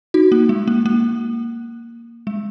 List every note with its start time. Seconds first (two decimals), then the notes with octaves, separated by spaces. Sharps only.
0.14 D#4 F#4
0.32 A#3
0.49 G#3
0.68 A#3
0.86 A#3
2.27 G#3